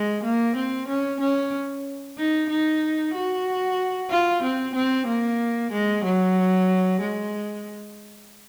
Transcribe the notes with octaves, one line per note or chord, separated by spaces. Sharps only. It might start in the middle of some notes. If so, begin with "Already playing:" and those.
Already playing: G#3
A#3
C4
C#4
C#4
D#4
D#4
F#4
F4
C4
C4
A#3
G#3
F#3
G#3